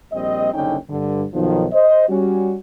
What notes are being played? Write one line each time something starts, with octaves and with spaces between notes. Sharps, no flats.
A#1 G3 C4 D#5
F#1 C2 D3 C#4 D#4 G5
G2 D3
B1 D#3 F3
C5 D#5
G3 C#4 F#4